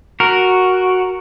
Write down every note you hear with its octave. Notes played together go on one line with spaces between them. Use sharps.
F#4 A#4